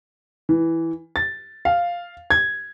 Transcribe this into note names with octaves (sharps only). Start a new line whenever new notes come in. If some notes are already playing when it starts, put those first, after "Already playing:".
E3
A6
F5
G#6